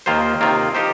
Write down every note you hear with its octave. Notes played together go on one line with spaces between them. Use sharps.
D#2 D#3 A#3 F4 C5
C3 D#3 A#3 F4
F3 D#4 G4 C5